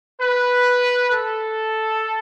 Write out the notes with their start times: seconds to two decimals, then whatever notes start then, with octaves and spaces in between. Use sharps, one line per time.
0.21 B4
1.11 A4